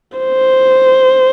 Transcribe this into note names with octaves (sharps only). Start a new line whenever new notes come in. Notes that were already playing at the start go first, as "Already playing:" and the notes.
C5